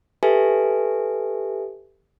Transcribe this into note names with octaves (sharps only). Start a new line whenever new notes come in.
G4 A4 B4 E5 G#5